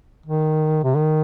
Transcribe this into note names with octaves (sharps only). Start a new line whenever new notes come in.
D#3
C3
D#3